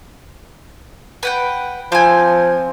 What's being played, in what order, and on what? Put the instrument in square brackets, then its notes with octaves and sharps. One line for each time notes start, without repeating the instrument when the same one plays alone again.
[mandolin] B4 F#5 G5
[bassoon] F3 [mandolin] C4 G#5